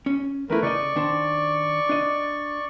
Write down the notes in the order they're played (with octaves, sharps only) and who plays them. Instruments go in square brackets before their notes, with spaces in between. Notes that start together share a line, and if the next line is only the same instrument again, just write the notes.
[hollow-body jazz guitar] C#4
[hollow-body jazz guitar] E2 E4 [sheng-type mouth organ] A3 A#4 B4
[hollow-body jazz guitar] C#3 D#5 [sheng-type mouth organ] D5 C#6
[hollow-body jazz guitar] D#3 D4 C5
D4 D#5